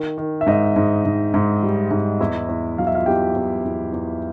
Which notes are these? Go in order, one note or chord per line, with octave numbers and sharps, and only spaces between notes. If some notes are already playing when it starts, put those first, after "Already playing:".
Already playing: D#3
D#3
E5
G#2 D#4 D#5
G#2
G#2
G#2
G3
G#2
E2 E4 E5
E2
F#3 F5
E5
F4 F5
E2 G4 G5
E2
E2
E2